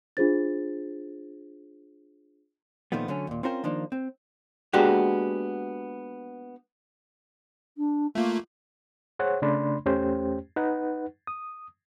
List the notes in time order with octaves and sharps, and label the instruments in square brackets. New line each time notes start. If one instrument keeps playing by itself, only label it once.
[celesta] D4 F4 G#4 C5 A6
[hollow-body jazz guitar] A#2 D#3 F3 A3 B3
D3 F#3 A3 C#4
D#2 A#2
C4 C#4 F4 A#4 C5 G5
D#3 F3 A#3 D4 D#4
C4
G#3 A#3 B3 D4 F#4 G4
[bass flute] D4
[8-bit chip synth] A3 A#3 [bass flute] F4
[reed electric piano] G#4 C5 C#5 F#5
C#3 A3 D4 D5 B5 C6
E2 A3 C#4 G4 C5 G5
D#4 B4 F#5
D#6